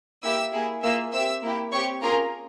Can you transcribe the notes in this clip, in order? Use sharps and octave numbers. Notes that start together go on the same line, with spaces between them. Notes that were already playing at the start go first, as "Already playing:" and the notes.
A#3 E4 G4 E5 E6
A#3 E4 G#4
A#3 F4 G#4 E5 E6
C4 G4 E5 E6
A#3 E4 G4
C4 G4 C#5 C#6
A#3 C#4 F4 G#4 A#4 A#5